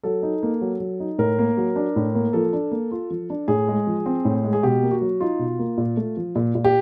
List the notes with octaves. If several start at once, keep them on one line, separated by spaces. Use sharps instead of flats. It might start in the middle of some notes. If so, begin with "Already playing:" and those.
F#3 A4
D#4
A#3
F#3
F#3
D#4
A2 A#4
A#3
F#3
D4
A2
A#3
F3 A4
D4
A#3
F4
F3
D4
A2 G#4
G#3
F3
C4
A2
G#3
G#4
B2 G4
A#3
F#4
F#3
D#4 F4
B2
A#3
A#2
A3
F3
A#2
A#2
G4